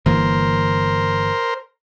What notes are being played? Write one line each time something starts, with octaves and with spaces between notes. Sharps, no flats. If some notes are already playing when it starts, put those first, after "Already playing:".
G1 E3 A#3 A#4 C5